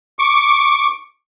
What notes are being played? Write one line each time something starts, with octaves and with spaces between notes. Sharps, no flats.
C#6 D6